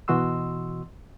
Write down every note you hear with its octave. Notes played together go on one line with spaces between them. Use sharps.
B2 E3 F#4 D#5 C6 E6